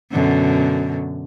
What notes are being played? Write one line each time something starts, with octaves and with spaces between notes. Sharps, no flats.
F#2 B2 D3